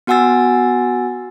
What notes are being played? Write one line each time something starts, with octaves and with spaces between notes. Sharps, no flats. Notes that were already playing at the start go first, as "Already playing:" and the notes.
B3 F#4 F#5 G#5 E6 A6